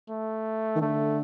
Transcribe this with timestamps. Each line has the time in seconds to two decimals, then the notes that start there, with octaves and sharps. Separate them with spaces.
0.09 A3
0.76 D#3
0.81 D3 A3